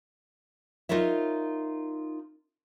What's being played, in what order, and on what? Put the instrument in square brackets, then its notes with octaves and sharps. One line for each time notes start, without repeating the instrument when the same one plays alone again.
[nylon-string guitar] D#4 F4 A#4 C#5 E5